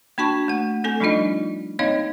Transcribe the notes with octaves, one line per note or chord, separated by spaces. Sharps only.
A#3 D4 F#4 A5 C#6
A3 F#5
A3 C4 A4 G#5
F3 G3 D4 D#4 F4 D#5
A#3 C4 D#4 C#5 D#5 F5